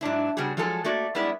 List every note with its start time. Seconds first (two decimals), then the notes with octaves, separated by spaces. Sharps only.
0.01 G#2 F#3 D4 E4
0.37 C#3 G3 B3 F#4 G#4
0.57 F3 F#3 G#3 F4 A4 G#5
0.84 A3 A#3 F#4 D5
1.15 G3 G#3 B3 E4 D5